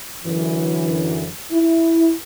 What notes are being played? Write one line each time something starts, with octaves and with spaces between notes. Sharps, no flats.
F#2 D3 E3
E4